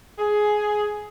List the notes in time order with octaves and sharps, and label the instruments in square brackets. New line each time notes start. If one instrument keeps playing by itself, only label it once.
[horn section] G#4